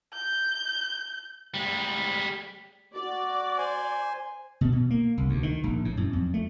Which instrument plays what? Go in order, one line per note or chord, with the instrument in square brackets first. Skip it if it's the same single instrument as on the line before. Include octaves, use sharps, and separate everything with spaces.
[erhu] G6
[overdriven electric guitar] G3 G#3
[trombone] F#4 [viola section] D5
[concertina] C5 G#5
[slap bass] B2
B2
A#3
C2
D2
D#3
A#1
A2
F#2
F2
A3